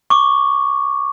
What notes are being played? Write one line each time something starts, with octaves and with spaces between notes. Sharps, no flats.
C#6 D6